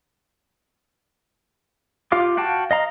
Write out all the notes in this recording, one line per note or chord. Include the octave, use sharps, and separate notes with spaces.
F4 G4 F5 D6
F#4 F5 G5 A5
D#5 F5 A#5